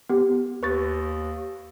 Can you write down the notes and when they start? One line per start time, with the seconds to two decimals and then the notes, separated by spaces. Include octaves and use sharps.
0.09 B3 G4
0.63 D#2 B4 C#6 A6